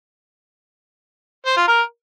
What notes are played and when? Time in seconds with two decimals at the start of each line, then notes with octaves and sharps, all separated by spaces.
1.46 C5
1.57 F4
1.68 A#4